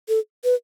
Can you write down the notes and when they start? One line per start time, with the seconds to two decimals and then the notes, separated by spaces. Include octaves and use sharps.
0.09 A4
0.44 B4